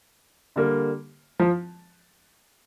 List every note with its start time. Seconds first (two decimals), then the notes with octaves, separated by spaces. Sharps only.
0.56 D3 G3 A#3
1.39 F3